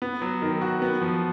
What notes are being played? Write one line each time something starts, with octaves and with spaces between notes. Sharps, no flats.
B3
F#3
D#3
F#4
B3
F3